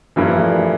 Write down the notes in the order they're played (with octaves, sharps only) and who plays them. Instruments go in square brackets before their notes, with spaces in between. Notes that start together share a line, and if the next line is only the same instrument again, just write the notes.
[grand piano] G2 F3 A#3 E4 [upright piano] E3
[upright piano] E3
A3
D4